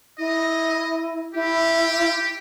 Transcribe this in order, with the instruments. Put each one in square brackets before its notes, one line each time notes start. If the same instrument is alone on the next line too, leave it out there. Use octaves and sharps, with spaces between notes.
[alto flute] E4 [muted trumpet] D#5
[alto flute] E4 [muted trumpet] G4